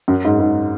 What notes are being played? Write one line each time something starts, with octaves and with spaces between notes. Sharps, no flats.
F#2
G#2
G#2